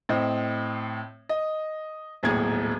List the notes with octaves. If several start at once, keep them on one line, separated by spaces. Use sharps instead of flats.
A2 C4 D#5
D#5
D#1 B1 A2 G#4 G#6